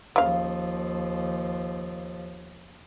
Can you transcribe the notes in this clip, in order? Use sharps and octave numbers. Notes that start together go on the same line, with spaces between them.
D#2 C#3 F3 F5